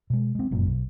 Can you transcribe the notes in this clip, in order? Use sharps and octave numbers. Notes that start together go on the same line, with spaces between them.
B2 G#3
G#3 C4
F1 F#2 A#2
B1